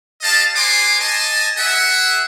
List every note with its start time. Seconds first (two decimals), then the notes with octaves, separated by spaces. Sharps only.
0.21 G4 D#5 F5 A5
0.55 F#4 B4 C#5 G#5 C6 D6
1.00 D#5 G#5 A5
1.58 G#4 E5 F#5